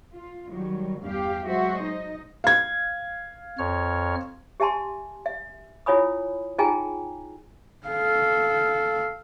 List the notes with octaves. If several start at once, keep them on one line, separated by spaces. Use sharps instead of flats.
F4
D#3 F#3 G3
E2 G2 G4 F5
F#3 G#3 F#4 C5 E5
D#4 D#5
F5 G#6
F2 C#5 F6
G4 E5 G#5 A5 C6
E5
E4 F4 C#5 G#5 B5 D#6
D#4 F4 G#4 G5 G#5 A#5
A4 F5